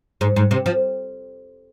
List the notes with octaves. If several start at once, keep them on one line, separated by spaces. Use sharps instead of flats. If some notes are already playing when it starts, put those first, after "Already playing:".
G#2
G#2
C3
F3